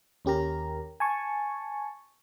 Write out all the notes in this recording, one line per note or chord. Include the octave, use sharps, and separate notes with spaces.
D#2 C#4 G4 A#4 A#5
G#5 A5 C#6